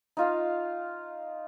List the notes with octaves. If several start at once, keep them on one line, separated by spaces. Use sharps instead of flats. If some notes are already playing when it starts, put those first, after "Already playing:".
D#4 F4 F5